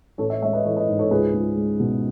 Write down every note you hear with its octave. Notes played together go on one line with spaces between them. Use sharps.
A1 A4 C#5
C#5 E5
G#3 C#5 E5
B4 D#5
E3 A4 C#5
B4 D#5
G#2
A4 C#5
C#2 G#4 B4
C#2
G#3
B2